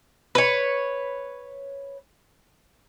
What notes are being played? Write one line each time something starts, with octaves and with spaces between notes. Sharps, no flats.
B4 C#5